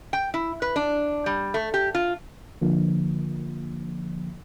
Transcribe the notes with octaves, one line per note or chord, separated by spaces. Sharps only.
G5
E4
B4
D4
G3
A3
G4
F4
D3 F3 A#3